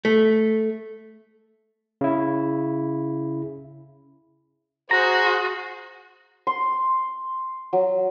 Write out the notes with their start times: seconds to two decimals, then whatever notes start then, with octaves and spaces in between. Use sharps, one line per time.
0.05 A3
2.01 C#3 E4
4.91 F#4 G#4 C5 A#5
6.47 C6
7.73 F#3